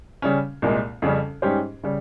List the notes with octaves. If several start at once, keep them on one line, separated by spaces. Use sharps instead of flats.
C#3 G3 C#4
C2 A#2 G#3
F2 C#3 G3 C#4
G#2 G3 C#4 G4 C5
C#3 G3